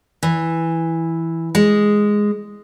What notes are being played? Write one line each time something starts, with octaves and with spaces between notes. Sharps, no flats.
E3
G#3